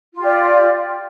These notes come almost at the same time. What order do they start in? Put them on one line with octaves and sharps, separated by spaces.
F4 G4 D5